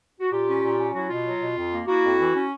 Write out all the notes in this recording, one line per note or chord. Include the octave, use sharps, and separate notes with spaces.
F#4
A#2 F4 G4
C#4
A#2
C#4
F#3 E4 F#4
B2 F4
F#3
B2
F2
A#3
A#3 E4 F#4
F2
E3
C#4